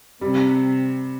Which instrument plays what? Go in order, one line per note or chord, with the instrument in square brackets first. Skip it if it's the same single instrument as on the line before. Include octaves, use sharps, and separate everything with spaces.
[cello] C3 [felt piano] G3